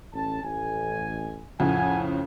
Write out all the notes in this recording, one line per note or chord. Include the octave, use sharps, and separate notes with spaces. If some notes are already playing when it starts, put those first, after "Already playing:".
A1 C#4 A5
A1 G#5
F2 A2 C#3 F#5 G#5